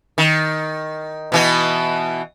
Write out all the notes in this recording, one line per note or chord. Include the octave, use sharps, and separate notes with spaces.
D#3
B2 E3 B3